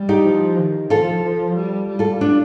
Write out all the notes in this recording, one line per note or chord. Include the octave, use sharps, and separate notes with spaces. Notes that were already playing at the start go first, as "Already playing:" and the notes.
Already playing: G3
D#4 G4
F3
D#3
F3 F4 A4
F3
G3
G3
F4 A4
D4 F4